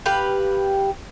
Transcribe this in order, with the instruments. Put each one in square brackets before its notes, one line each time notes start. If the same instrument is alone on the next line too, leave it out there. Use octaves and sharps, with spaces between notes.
[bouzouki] G4 B4 F5